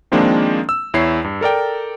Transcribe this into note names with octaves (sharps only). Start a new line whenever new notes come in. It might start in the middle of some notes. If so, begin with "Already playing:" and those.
D#3 F3 G#3 A#3 C4 D4
E6
E2 E4 C#5 C7
G2
A4 A#4 D5 G5